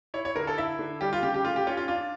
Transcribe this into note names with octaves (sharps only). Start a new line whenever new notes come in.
E4 C#5
C#5
D3 A#4
A4
E4 E5
D3
G3 G4
F4
C#3 G4
G4
A3 F4
G4
C#4 F4
F4
D4 F4